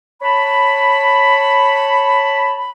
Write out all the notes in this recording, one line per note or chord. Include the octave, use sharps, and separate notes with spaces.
C#5 A5 B5